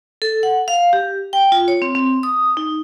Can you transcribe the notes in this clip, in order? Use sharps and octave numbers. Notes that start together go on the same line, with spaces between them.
A4
F#5
F5
G4
G5
F4
C#5
C4
C4
D#6
D#4